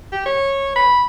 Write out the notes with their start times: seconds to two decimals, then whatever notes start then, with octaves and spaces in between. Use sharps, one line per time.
0.12 G4
0.26 C#5
0.76 B5